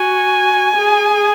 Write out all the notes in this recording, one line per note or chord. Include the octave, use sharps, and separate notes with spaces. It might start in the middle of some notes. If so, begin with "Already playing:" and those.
Already playing: F#4 G#5
G#4